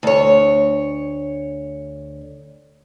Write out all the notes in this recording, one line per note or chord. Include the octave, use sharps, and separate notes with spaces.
D2 C#5